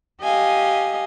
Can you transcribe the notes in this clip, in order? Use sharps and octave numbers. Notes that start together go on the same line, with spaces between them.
G4 D#5 F5 G#5